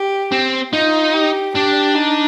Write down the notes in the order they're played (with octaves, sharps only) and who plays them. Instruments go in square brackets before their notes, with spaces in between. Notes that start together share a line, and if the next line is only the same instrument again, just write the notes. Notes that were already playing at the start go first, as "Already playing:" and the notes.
Already playing: [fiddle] G4
[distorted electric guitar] C4
[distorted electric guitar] D#4 [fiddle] F4
[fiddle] G4
[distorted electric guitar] D4 [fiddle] G4
[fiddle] D#4